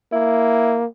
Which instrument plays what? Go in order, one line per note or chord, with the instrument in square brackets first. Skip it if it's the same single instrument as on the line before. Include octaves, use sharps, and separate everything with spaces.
[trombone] A#3 [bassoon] E4